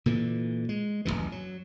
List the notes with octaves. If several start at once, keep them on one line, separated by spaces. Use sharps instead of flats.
A#2 D3 E3
G#3
D1 C#2 F#2 E3
F#3